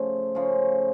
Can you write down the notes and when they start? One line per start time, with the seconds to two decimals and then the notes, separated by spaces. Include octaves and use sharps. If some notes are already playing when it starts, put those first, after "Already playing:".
Already playing: C#3 F3 A3
0.35 C#3 F3 A3